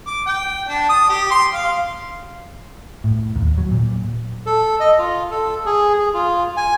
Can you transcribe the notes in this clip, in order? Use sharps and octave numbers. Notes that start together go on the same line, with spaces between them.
D6
G5
D4
D#6
G4
C6
F5
A2
D#2
F#3
A#2
A4
D#5
F4
A4
G#4
G#4
F4
G#5